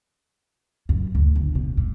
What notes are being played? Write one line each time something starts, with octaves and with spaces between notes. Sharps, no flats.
F#2
D2
G1
B2
G2